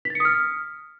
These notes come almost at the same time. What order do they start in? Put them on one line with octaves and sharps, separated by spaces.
B6 A6 C#7 D#6 F6